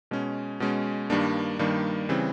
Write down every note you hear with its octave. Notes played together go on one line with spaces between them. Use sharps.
B2 G#3 C#4
B2 G#3 C#4
G2 D#3 G3 A#3 D4
G2 D#3 G3 A#3 D4
C#3 E3 G3 C4